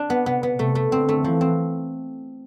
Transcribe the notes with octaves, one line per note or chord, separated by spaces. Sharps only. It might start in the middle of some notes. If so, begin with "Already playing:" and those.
Already playing: D4
B3
C3 B3
B3
C3 A3
A3
D3 C4
A3
E3 F3
C4